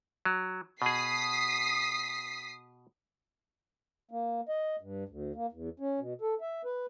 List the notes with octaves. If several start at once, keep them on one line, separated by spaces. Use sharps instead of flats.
F#3
B2 G#4 D#6 B6 C7
A#3
D#5
G2
D2
A#3
E2
C#4
B2
A4
E5
B4